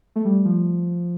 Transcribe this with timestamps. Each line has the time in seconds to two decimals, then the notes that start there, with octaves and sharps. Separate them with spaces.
0.16 A3
0.25 G3
0.45 F3